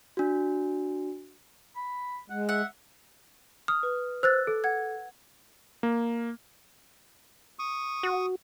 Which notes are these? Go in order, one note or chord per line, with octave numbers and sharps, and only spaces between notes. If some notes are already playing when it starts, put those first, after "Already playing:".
D4 F#4
B5
G#3 F#5
E5 F#5
D#6 F6
B4
C5 E6 F#6 A6
A4
F#5 G#6
A#3
C#6 D#6
F#4